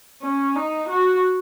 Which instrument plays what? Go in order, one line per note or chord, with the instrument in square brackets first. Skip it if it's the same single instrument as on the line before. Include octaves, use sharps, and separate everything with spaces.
[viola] C#4
D#4
F#4